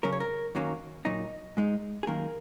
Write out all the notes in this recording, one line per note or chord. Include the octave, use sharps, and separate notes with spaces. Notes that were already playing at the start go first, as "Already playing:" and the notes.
C#3 F#3 C#4 A#4
C#5
A#4
F#2 D#3 F#3 A#3 C#4
A#2 F#3 D#4 D#5
G#2 G#3 D#4
G#4
F#2 D#3 A#3 A#4